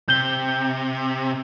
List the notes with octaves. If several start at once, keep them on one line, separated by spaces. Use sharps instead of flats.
C3 G6 G7